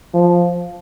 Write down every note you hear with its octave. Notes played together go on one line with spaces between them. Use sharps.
F3